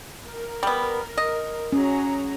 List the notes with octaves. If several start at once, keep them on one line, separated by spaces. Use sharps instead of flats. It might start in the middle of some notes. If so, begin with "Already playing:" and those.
A#4
G3 B3
D#5
F#3 C#4 G#4 A#5